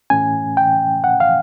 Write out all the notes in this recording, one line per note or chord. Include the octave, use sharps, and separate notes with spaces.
A2 E3 A3 C#4 G#5
G5
F#5
F5